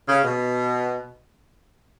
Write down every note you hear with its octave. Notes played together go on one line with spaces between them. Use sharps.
C#3
B2